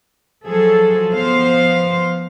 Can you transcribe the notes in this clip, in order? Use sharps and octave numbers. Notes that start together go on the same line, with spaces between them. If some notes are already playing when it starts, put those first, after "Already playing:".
F3 F#3 G#4 A4
F3 B3 C5 F5